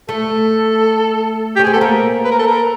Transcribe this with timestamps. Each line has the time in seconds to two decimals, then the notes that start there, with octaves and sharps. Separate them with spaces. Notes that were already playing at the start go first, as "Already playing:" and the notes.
0.09 A3 A4
1.56 C#4 G4
1.64 C4 G#4
1.73 B3 A4
1.81 A#3 A#4
2.25 B4
2.31 A#4
2.39 A4
2.47 A#4